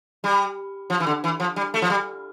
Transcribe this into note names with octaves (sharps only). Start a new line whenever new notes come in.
G3
F3
E3
D3
E3
F3
G3
A3
F3
G3